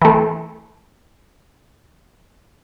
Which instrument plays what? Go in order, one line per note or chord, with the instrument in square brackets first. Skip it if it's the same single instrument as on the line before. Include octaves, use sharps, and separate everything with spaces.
[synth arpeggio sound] E3 A3